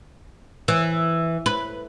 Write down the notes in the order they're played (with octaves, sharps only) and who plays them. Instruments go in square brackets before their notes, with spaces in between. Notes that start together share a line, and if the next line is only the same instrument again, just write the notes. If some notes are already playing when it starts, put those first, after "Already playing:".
[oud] E3
B4